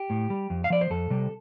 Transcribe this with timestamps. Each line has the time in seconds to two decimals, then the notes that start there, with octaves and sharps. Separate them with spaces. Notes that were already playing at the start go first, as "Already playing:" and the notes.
Already playing: G4
0.10 A2
0.30 G3
0.50 F2
0.64 F5
0.70 F3 D5
0.81 C5
0.90 F2 A4
1.10 C3 G3